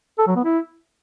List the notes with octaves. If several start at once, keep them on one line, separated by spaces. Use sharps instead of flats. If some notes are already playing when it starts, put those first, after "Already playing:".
A4
F#3
B3
E4